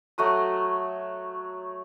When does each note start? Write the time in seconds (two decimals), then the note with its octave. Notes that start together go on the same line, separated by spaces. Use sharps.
0.18 F#3 A3 F#4 D#6